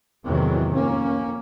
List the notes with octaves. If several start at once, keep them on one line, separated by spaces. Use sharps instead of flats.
E2 A2 C3 D#3 E3 F#3
F2 A#3 C#4